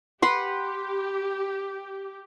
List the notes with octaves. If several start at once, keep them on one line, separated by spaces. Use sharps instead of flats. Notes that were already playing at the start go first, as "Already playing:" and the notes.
G4 B4 F#5 C6